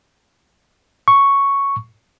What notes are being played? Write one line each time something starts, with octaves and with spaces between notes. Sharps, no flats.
C#6